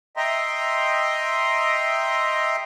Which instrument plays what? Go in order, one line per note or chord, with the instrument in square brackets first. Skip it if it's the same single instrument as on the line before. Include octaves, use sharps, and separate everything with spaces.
[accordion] D#5 E5 G5 A#5 C6